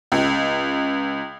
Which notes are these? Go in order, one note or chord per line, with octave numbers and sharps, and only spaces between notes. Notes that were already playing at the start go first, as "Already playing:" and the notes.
C#2